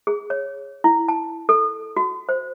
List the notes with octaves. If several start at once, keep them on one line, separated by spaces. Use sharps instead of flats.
G#4
C#5
E4
A5
A4
F#4
C5